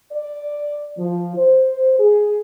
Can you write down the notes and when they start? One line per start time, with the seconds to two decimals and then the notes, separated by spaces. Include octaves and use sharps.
0.12 D5
0.99 F3
1.37 C5
1.99 G#4